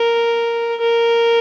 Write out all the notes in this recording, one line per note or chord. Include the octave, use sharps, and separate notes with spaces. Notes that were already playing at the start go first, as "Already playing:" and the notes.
Already playing: A#4
A#4